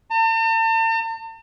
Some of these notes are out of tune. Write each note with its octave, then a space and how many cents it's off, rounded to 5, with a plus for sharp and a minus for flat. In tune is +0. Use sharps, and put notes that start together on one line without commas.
A5 +45